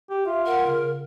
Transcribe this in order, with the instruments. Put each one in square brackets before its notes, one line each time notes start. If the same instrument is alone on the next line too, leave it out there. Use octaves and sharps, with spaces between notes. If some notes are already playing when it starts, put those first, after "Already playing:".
[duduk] G4
[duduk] F4 [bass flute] E5
[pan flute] A#4 [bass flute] F#5
[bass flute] C#3